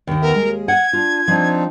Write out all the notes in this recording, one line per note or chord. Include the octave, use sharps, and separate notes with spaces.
D#2 D#3
F#2 B3 A#4 E5
D#2 G#3 G#4
F#5 G#6
D4 F4
F3 C4 D4 D#4